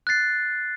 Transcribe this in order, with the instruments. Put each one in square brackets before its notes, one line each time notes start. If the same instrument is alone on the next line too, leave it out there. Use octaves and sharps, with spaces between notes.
[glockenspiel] F#6 A6 C7